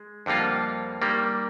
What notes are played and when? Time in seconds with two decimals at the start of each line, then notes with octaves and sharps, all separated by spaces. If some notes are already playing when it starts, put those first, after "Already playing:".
Already playing: G#3
0.26 F2 D3 G3 A#3 F4
1.02 D#3 G3 A#3